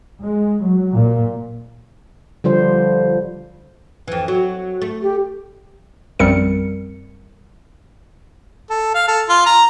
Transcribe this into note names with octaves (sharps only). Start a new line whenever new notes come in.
G#3
F#3
A#2
D3 F3 G3 C5
F2 E3
F#3
A3
G4
A#1 F#2 G3 C4 A#4 C#7
A4
F5
A4
F4
A#5